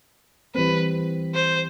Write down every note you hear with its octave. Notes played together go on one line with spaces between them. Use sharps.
E3 G3 C4 B4
C5